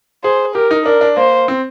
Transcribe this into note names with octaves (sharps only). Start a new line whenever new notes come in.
G#4 C5
G4 A#4
D#4
D4 A#4
D4
A#3 C5
C4